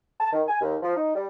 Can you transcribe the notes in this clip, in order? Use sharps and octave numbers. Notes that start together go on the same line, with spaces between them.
A5
D#3
G#5
D#2
F3
D#4
G3